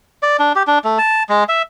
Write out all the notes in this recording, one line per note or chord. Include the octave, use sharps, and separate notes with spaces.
D5
D4
G4
D4
A3
A5
G#3
E5